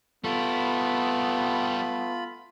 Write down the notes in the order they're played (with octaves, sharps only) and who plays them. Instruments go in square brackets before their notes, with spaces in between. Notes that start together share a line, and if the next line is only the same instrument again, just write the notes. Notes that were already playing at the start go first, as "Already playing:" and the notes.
[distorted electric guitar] G3 E4 [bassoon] A3 [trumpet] B3 [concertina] F4 B5